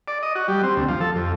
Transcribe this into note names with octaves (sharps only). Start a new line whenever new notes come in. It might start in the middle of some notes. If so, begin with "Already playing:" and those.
D5
D#5
F#4
G3
C4
D2
F3
A4
F2